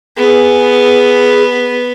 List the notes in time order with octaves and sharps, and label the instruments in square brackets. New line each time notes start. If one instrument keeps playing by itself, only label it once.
[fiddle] B3 [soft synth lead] G#4